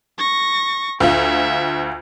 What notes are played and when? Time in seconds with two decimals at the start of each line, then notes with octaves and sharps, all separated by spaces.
0.18 C#6 A#6
1.00 D2 F4 E5